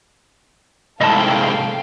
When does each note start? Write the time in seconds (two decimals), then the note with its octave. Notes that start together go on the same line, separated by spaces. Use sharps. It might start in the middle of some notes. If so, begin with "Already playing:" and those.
1.01 C2 G#2 A4 D#5 F5 G5 A5